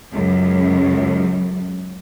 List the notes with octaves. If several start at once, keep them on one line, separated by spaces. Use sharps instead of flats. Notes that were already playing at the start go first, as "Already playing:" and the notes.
C#2 F#2